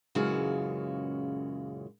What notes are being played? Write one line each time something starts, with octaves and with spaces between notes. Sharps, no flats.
F#2 A#2 C#3 E3 G#3 F#4